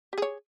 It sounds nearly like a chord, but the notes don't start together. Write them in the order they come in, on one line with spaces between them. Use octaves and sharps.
G4 G#4 C#5